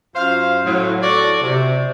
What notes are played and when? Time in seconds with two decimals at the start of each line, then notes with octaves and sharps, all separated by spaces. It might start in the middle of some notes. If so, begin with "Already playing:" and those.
0.15 F#2 F4 C5 F5
0.65 A2 F#3
1.02 F#4 A4 D5
1.41 C3